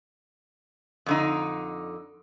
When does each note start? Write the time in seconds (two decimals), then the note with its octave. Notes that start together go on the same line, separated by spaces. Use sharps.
1.06 F2 D3 D#4